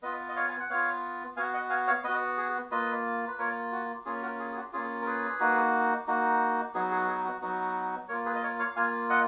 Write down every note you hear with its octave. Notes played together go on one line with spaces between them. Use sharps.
B3 F4 B4 D#5
D#5
C#5 F5
G#5
F#5
B3 F4 C#5 F5
B3 F#4 F5 G#5
D#5 F#5
F5 G#5
C#5 F5
B3 F#4 B4 D#5
G#4
A#3 F4 B4 D#5
B4
A#3 F4 A#4 C#5
F#4
A#3 C#4 F4 G#4
F#4 A#4
G#4
G#4
F#4
A#3 C#4 F4 G#4
A#4
G#4 B4
A#3 D#4 F#4
A#3 D#4 F#4
F#3 B3 D#4 F#4 G#4
G#4
G#4
F#4
F#3 B3 D#4 F#4
A#3 F4 A#4 C#5
G#4 B4
D#5
A#4 C#5
C#5 F5
A#3 F4 F5 G#5
D#5 F#5